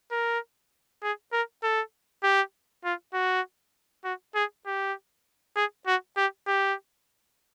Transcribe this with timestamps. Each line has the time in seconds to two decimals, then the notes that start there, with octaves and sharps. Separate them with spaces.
0.12 A#4
1.03 G#4
1.33 A#4
1.63 A4
2.23 G4
2.84 F4
3.14 F#4
4.04 F#4
4.35 G#4
4.66 G4
5.56 G#4
5.87 F#4
6.17 G4
6.47 G4